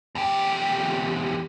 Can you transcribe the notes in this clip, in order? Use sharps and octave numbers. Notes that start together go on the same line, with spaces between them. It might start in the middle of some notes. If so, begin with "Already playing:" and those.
E2 G4